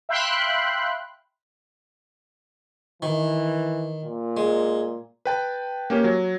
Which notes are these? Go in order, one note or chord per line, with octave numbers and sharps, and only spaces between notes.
E5 F5 G5 B5 C6 F#6
D#3 E3
A#2
G#3
B4 G5 A5
A#3 C#4 G4
F#3